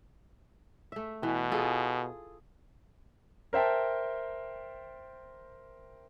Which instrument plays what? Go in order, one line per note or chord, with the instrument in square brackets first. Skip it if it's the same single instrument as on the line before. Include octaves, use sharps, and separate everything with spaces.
[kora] A3 E5
[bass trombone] B2 [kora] E3
[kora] F4 G#4 A4
[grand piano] A#4 C5 E5 G5 A5